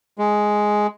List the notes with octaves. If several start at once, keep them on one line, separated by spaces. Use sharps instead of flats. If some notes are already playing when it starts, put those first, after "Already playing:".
G#3